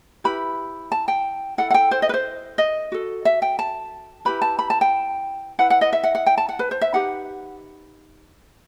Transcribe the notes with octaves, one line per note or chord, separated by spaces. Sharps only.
E4 G4 B4 B5
A5
G5
E4 A4 F#5
F#5
G5
C5
D#5
B4
C5
D#5
F#4 A4
E5
G5
A5
E4 G4 B4 B5
A5
B5
A5
G5
E4 B4 F#5
F#5
D#5
E5
F#5
F#5
G5
A5
F#5
B4
C5
E5
D#4 G4 B4 F#5